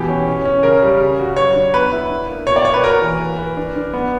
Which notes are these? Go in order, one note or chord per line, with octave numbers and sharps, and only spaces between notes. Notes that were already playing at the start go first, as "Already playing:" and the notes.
Already playing: B2 E3 G4
C#4
C#4
C#4
C#3 A#4
G3
C#3
F#4
F#3 C#5
D4
B3 B4
E4
D4
A#3
B2 C#5
D5
A#3 C#5
B4
F#4 A#4
E3
B4
B4
D4
D4
B3